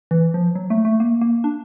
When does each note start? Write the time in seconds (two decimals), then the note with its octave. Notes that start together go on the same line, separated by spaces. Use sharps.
0.11 E3
0.34 F3
0.55 F#3
0.70 A3
0.85 A3
1.00 A#3
1.21 A#3
1.44 D4